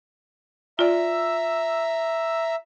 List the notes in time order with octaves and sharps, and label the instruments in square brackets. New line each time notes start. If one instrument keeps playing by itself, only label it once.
[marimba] F4 D5 [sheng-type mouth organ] E5 A#5 E6